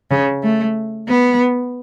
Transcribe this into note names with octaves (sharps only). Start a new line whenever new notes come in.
C#3
A3
B3